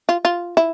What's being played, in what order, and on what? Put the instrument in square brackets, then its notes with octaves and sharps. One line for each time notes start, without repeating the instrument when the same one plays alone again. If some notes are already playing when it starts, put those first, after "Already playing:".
[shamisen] F4
F4
E4